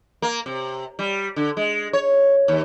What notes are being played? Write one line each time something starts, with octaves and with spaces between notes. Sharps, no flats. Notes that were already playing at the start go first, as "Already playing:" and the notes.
A#3
C3
G3
D3
G#3
C#5
D#2